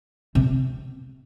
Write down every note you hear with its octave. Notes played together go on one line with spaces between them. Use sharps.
C3